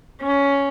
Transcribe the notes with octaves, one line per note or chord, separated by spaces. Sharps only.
C#4